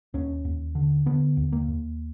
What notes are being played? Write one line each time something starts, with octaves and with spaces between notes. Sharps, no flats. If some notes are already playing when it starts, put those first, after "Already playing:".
D#2 C#4
D#2
D3
D3 B3
D#2
A#3
D#2